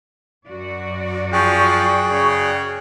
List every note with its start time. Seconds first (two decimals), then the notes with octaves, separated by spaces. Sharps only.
0.47 F#2 F#4 D5
1.33 F3 G#4 G5 C#6 F#6
2.10 C#3